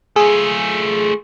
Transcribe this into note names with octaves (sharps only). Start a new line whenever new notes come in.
A3 F4 G#4